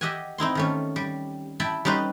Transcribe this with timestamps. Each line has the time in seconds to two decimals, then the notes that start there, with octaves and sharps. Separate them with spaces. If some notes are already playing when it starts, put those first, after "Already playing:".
0.01 G4 D#5 E5 F#5 G#5
0.38 C4 D#4 E4 C6
0.55 D#3 A3 C#4
0.96 G3
1.60 E4 E5 G5 A5 B5
1.85 G3 C#4 D#4 B4 C5